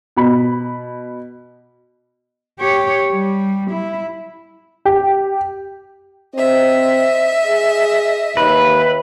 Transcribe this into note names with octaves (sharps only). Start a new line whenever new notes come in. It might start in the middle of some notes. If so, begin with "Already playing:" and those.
B2 B5
G4 C#5
G3
E4
G4
C4 D#5 E5
G#4
D#2 B4